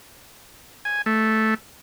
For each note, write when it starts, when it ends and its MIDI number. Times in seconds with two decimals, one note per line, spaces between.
0.85 1.02 80
1.06 1.54 57